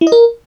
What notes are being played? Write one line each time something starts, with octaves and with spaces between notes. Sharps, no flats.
E4
D#5
A#4